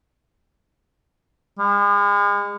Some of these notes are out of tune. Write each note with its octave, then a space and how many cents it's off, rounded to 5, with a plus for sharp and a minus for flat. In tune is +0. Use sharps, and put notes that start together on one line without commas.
G#3 -40